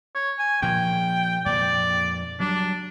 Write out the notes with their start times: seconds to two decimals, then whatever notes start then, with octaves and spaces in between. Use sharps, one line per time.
0.15 C#5
0.39 G#5
0.62 A#2 F3 A#3 G5
1.46 F2 A#2 D5
2.40 F#3 G3 D4